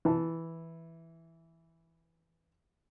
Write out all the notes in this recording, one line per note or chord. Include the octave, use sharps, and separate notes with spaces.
E3 A5